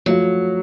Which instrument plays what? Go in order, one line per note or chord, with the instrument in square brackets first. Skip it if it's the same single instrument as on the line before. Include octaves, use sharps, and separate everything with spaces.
[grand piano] F3 A3 F4 [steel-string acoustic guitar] F#3